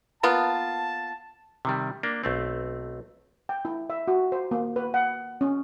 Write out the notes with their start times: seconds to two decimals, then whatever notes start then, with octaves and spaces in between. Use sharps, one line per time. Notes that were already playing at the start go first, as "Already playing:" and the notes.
0.23 A#3 B3 F4 A5
1.65 C3 D#3 G3
2.03 A#3 D4
2.24 B1 A3 C4
3.49 G5
3.65 E4
3.90 E5
4.08 F#4
4.32 C5
4.51 A#3
4.76 B4
4.94 F#5
5.41 C#4